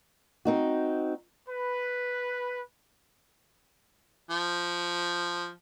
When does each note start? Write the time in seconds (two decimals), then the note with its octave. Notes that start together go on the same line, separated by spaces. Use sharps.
0.45 C4 D#4 F#4
1.47 B4
4.30 F3